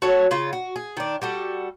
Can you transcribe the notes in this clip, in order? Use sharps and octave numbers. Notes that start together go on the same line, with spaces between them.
F#4 A4 C#5
C#3 F4
F#4
G#4
D#3 D4
G3 F#4 A4